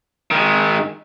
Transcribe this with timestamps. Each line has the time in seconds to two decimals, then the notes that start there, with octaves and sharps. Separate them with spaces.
0.31 D#3 G#3